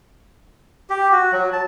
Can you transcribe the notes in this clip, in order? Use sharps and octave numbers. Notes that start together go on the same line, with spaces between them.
G4
F#4
F#3
A5